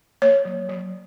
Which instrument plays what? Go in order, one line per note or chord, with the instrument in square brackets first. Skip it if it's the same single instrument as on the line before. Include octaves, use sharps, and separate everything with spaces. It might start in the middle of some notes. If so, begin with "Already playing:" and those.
[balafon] A#3 C#5
F#3
F#3